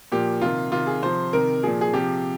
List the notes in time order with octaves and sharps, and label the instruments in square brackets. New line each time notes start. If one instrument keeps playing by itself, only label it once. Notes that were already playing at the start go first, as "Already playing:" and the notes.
[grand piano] A#2 F3 G4
C3 D#3 F4
C3 D#3 F4
G#4
C3 F3 C5
C3 D#3 A#4
A#2 F3 G#4
G#4
C3 F3 G4